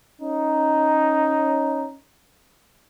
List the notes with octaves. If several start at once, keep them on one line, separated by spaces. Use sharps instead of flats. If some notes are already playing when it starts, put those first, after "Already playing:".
C#4 D#4